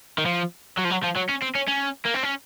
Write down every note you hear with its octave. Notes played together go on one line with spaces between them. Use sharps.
D#3
F3
F#3
F3
F#3
F3
F#3
C#4
C4
C#4
C#4
A#3
C4
C#4